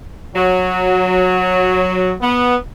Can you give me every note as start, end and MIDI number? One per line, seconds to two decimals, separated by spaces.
0.35 2.13 54
2.21 2.56 59